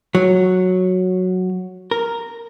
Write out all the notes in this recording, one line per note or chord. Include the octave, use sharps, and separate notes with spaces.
F#3
A#4